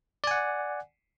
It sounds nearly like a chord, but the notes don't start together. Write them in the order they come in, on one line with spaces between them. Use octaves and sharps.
D5 G#5 F#5